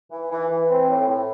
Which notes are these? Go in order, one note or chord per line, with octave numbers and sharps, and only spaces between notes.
E3
E3
E3
C4
A2
A2